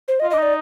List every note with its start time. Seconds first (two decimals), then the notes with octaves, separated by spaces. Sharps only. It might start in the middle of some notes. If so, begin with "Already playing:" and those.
0.08 C5
0.20 D#5
0.23 F4
0.31 D4 D#5
0.38 D#4 D5